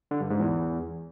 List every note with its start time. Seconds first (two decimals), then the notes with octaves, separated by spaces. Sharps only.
0.11 D3
0.21 G2
0.30 G#2
0.39 E2